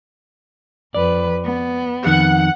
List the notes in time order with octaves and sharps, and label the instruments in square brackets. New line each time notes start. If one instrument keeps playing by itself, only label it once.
[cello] F2 B4 [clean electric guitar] D5
[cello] B3
[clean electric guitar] F2 D#3 [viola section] F#5